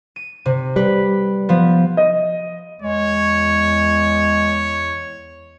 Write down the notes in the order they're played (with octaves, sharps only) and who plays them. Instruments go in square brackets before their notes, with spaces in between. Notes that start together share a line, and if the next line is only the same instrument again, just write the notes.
[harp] D#7
C3
[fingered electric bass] G3 [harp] B4
[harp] F3 B3
[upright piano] D#5
[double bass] E2 [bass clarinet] G#3 [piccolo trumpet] C#5